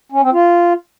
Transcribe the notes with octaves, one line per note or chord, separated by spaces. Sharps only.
C#4
C4
F4